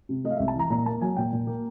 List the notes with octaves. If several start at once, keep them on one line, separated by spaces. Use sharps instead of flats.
C3
A3 D#5
F5
C2 E5
A5
E3 A#5
A#2 A#5
A#3 A5
F#3 G#5
A#2 G5
A#2
A#3